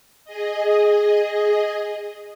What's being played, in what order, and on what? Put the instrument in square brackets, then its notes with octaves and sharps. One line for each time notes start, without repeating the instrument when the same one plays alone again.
[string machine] G#4 D#5